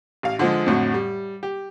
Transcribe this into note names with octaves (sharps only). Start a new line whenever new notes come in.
A1 F5
D3 F3 G#3
F2 A2 D3 F#3
G3
G4